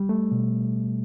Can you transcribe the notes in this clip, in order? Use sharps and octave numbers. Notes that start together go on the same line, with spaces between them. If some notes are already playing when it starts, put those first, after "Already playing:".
Already playing: G3
A3
B2